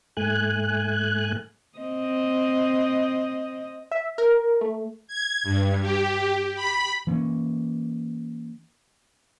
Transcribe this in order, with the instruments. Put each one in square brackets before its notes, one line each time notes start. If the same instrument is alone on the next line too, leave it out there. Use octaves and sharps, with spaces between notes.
[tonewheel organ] G#2 A3 G#5 F#6
[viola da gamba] C4 D#5
[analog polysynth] E5
A#4
A3
[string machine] G#6
G2
G4
B5
[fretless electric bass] E3 A#3 B3 C#4